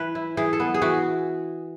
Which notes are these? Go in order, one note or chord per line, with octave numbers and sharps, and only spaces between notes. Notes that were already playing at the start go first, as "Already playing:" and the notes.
Already playing: E3 B4
E4
E3 G#4
A4
B3
G#4
E3 F#4